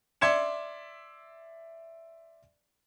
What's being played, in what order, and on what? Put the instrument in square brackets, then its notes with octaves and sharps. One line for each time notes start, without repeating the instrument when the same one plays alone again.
[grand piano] D5 E5 C6 G#6 C#7 E7